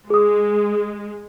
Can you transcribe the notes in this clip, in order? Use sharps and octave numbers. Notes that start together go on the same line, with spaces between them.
G#3 G#4 D#6